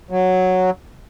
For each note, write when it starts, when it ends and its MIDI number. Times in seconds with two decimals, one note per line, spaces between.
0.10 0.70 54